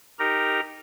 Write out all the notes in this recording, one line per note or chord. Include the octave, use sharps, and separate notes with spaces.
D#4 G4 A#4 A#5